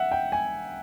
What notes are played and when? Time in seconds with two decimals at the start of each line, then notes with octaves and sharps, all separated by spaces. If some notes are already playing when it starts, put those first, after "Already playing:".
Already playing: E5 F#5
0.12 G5
0.32 G#5